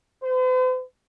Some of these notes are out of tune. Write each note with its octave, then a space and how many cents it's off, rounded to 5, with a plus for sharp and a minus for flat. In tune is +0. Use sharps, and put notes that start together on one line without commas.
C5 -45